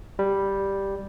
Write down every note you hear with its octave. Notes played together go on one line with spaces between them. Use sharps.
G3